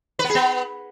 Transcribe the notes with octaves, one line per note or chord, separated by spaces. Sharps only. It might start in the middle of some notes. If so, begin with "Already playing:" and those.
B4
B3
G#4
B3